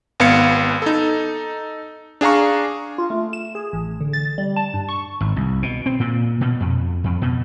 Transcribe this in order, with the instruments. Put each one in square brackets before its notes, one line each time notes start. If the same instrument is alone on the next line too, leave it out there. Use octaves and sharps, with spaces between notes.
[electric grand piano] G#1 B3 F5 C#7
D#4 A4
D4 G#4 F5 A#5 C#6
[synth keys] F4
A3
E7
G#4
A1
D3
A6
G3
A5
G2
C#6
[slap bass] G#1
C2
B2
C4
A#2
B2
F2
F2
B2